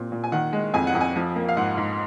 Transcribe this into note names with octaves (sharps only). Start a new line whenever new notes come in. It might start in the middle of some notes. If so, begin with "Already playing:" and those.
Already playing: A#2 C4
A#2
G#5
D#3 F#5
G#3
F2 G#5
F#5
F2
G#5
F3
A#3
F5
G#2 F#5
G#2